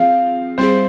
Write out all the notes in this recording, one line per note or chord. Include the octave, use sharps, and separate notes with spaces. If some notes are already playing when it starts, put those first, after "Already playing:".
Already playing: F3 C4 F4 G#4 F5
G3 C4 E4 G#4 C5